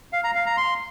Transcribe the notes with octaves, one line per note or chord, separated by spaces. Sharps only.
F5
A#5
F5
A#5
C6